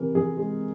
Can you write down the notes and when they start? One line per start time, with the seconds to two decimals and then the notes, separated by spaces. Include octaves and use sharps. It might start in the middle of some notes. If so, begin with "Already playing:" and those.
Already playing: C3 E3 A#4
0.15 E3 G#4
0.37 G#3